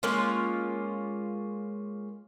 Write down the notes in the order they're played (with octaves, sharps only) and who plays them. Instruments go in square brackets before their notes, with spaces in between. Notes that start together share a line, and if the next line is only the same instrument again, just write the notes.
[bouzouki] G#3 A#3 C#4 F4